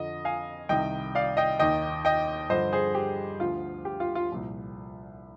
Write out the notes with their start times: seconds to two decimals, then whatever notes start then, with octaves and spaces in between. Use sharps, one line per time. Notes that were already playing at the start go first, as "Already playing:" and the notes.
Already playing: F2 D3 F3 D#5
0.25 F5 G#5
0.69 C2 C3 D#3 D#5 G5
1.15 D5 F5
1.37 D#5 G5
1.59 D#2 D#3 D#5 G5
2.05 D#5 G5
2.50 G2 D3 F3 C5 D#5
2.73 G#4 C5
2.95 G4
3.40 D2 D3 F3 F4
3.85 G4
4.00 F4
4.15 F4
4.30 C2 A#2 F3